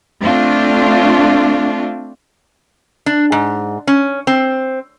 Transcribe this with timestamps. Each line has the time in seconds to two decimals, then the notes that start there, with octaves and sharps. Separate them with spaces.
0.21 A3 C4 D4 F4
3.06 D4
3.32 G#2
3.87 C#4
4.27 C4